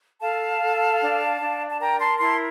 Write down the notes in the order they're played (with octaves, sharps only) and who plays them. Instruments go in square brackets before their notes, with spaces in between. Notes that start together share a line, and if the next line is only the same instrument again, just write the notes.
[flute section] A4 F5 A5
A4
D4
D4
A5
A#4 G5 A#5
A5 C6
E4 A5 C6